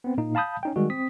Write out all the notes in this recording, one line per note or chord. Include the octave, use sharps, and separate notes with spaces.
B3 C4
A#2 A#3 D#4
F5 A5 B5 D#6 G6
C#4 D#4 G5
D#3 G3 G#3 F#4
C4 D#6 B6